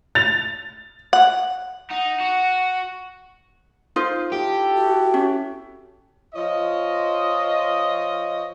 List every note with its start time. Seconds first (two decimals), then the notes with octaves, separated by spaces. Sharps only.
0.15 A6 F7
1.13 F#5
1.90 D#4 F#5
2.20 F#4
3.96 D#4 F4 C5
4.32 E4 G4 A4
4.77 F#4
5.14 C#4
6.35 F3 F4 C#5 D#5